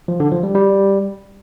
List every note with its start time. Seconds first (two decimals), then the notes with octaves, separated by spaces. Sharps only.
0.08 F3
0.20 D3
0.32 F3
0.43 G3
0.55 G3